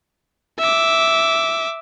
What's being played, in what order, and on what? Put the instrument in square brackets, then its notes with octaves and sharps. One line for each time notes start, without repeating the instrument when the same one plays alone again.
[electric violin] E5 D6